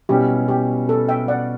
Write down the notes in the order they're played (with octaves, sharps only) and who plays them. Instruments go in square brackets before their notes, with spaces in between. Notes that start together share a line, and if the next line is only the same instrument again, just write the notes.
[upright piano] B2 G3 C#4 E4 [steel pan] G4
[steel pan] G4
A4
E5 G5
D5 F#5